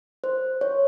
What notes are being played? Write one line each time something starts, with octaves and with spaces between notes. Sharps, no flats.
C5
C#5